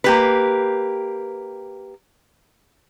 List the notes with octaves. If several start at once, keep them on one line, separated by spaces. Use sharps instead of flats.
A#3 G4 B4